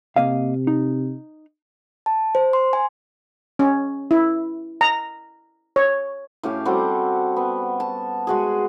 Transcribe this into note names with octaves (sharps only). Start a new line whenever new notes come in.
C3 A#3 D#5 F5
D#4
A5
C5
C6
G#5
C#4
E4
A#5
C#5
A2 C#4 G4 F5
G3 C4 F#4 A4
B3
A5
G#3 F#4 G#4